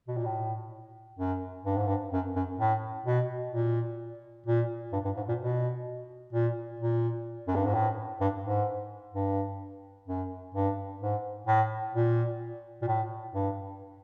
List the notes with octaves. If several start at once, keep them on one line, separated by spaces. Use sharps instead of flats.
B2
A#2
A2
F#2
G2
G#2
G2
F#2
F#2
A2
B2
A#2
A#2
G2
G2
G#2
A#2
B2
A#2
A#2
F#2
G2
G#2
A2
G2
G#2
G2
F#2
G2
G#2
A2
A#2
A#2
A2
G2